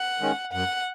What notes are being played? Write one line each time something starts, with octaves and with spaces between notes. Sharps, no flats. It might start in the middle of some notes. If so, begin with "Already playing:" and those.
Already playing: F#5
D#3 G#3 C#4
F#2 F#5